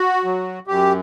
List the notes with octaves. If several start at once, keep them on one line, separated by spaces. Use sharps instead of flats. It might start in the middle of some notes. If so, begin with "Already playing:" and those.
Already playing: F#4
F#3
F#2 G4